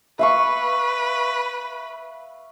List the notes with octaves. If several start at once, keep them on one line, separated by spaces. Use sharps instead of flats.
B4 E5 F5 C#6